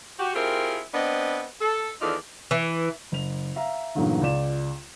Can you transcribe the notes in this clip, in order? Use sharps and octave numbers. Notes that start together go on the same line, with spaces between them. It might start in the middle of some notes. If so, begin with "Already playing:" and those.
F#4 G4
C4 E4 F4 G4 G#4 A#4
B3 C4 D4 B4 D#5
A4
E2 D#3 D#4 F4 A4 D5
E3
F#1 F7
E5 F5 A#5
E2 G2 A#2 D3 F#3 D#4
C#2 F4 D5 E7